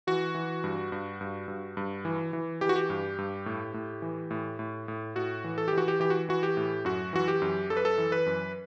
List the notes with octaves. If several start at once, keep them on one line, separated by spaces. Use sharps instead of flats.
E3 F#4
E3
G2
G2
G2
G2
G2
E3
E3
E3 G4
F#4
G4
G2
G2
A2
A2
E3
A2
A2
A2
A2 F#4
E3
A4
E3 G4
F#4
G4
E3 G4
F#4
E3 F#4
G4
A2
F#2 F#4
E3 F#4
G4
F#2
F#2 A4
B4
A4
E3
B4
F#2